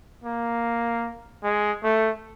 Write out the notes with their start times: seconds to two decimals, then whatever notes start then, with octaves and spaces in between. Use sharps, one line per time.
0.24 A#3
1.44 G#3
1.83 A3